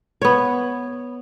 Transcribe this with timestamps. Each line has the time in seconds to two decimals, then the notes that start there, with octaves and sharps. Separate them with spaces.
0.22 B3 C#5